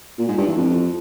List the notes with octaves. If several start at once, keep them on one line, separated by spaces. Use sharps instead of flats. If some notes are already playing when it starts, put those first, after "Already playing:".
A#2
G#2
G2
E3
F2